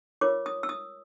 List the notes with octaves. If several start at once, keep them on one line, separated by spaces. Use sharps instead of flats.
F4 A#4 C#5 D6
D#6
E6
D#6